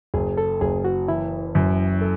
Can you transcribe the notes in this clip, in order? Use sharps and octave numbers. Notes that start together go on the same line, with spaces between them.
F#1 G#4
A4
F#1 G#4
F#4
E3 E4
F#2
A4